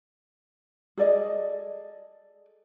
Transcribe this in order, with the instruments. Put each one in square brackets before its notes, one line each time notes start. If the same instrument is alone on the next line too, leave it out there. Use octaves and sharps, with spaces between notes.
[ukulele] G#4 A4 D5 D#5